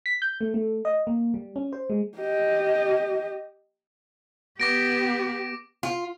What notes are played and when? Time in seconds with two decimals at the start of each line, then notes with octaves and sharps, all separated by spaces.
0.06 B6
0.22 G6
0.41 A3
0.54 A3
0.85 D#5
1.07 A#3
1.34 G3
1.56 C#4
1.73 C5
1.90 G#3
2.18 G4 D#5
4.60 B3 G4 D6 A#6 D7
5.83 F4